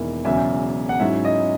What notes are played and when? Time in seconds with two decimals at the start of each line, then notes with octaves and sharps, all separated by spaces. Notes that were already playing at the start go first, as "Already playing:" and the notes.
Already playing: E1 E2 D#3 A#3 E4
0.25 E1 E2 C#3 F#3 E5 G#5
0.89 F#5
1.00 G#2 F#3 C#4 E4 E5
1.25 D#5